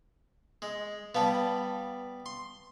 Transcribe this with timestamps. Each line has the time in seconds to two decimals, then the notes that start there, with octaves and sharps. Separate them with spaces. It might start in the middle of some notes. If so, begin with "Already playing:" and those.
0.62 G#3
1.15 G3 B3 F5 A5
2.26 C6